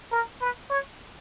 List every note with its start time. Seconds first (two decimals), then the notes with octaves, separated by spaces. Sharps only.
0.12 A#4
0.41 B4
0.70 C#5